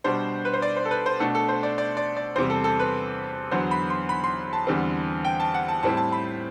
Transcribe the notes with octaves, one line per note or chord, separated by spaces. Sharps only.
B2 G3 D4 C5
B4
C5
D5
C5
A4
B4
C5
B2 A3 D4 A4
A4
C5
D5
D5
D5
D5
E2 C3 G3 C5
A4
A4
B4
E2 D3 F#3 B3 C5
B5
C6
B5
C6
A5
E2 D3 G3 C4
G5
A5
F#5
A5
A2 G3 C4 E4 A5
A5
B5